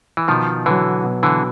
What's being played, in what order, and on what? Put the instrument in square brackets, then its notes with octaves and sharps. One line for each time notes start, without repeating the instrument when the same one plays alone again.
[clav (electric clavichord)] E3
[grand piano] B2 [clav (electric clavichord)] D#3 F3
[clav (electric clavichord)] D3 E3 [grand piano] F#3 B3
[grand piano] B2
[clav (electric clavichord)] D3 E3